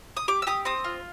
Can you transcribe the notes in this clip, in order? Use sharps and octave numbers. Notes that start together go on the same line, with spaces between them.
D#6
G4 D6
E6
G4 D#6
C4 D#6
F4